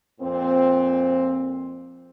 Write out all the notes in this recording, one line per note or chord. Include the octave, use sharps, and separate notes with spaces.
F2 A#2 C4